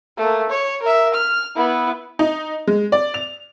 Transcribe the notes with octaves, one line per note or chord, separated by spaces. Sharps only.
A3 A#3
C#5
A#4 E5
F6
B3 E4
D#4
G#3
D5
F7